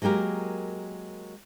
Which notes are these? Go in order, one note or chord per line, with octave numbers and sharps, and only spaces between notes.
F#3 G#3 A#3 G4 A#4